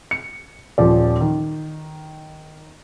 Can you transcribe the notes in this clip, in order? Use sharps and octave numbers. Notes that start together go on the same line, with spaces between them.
C#7
D#1 F3 D5
D#3